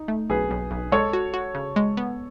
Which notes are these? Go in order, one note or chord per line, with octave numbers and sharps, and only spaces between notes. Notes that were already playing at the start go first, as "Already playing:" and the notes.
Already playing: D#4
A3
B1 G#4 B4
B1
B1
G#3 A4 C#5
F#4
F#4
C#3
G#3
B3